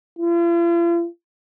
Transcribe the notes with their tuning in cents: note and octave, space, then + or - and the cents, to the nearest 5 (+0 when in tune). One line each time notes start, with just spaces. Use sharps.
F4 -45